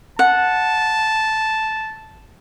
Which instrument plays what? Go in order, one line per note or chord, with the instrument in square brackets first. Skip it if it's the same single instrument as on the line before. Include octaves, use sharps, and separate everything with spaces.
[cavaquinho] F#5 [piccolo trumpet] A5